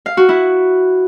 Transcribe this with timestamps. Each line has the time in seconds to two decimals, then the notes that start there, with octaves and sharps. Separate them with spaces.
0.06 F5
0.17 F#4
0.29 E4